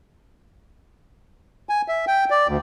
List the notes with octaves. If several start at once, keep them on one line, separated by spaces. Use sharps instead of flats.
G#5
E5
G5
D5
D2